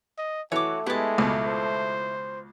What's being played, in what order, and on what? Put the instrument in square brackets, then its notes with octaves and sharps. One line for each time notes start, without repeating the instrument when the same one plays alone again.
[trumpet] D#5
[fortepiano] E3 [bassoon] A3 [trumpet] F#4 [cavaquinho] C#5 D6
[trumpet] G#3 [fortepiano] B3 G4 [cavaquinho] E4 A5
[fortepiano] C#2 B2
[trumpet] C5